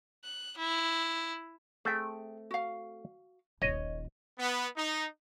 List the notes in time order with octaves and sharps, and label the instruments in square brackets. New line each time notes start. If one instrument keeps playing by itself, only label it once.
[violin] F#6
E4
[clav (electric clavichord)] A3 C4 [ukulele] G#4 G5
[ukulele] F#4 F5
[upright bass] D#1 A#1 [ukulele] C#5 [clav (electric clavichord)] D#5
[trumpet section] B3
D#4